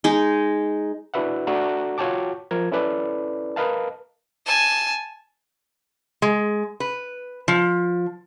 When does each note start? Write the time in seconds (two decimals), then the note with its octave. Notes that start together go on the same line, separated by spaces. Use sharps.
0.04 G#3 D#4
1.14 D4 E4 F#4 B4 E5 F#5
1.47 D4 F#4 A4 A#5
1.98 F4 F#4 C#5 G5 A5 D6
2.51 F3 A#4 G#6
2.72 C#4 E4 A4 B4 D5
3.56 A#4 B4 D#5 F5 A5
4.46 G#5 A5
6.22 G#3
6.80 B4
7.48 F3